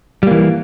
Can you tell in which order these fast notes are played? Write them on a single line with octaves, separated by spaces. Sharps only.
G3 A#3 E3